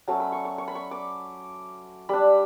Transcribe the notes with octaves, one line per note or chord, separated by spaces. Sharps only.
F#3 A3 C#4 A5
B5
C#6
C#6
C#6
B5
C#6
D6
G3 D4 B5